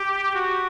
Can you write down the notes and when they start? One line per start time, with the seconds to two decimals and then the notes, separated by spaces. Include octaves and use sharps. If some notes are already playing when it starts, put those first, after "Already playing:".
Already playing: G4
0.35 F#4